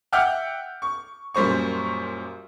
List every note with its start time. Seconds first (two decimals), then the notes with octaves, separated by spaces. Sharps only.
0.12 E5 F#5 G5 D6 F6 G6
0.82 C#6
1.34 F#2 A#2 G3 C5 C#6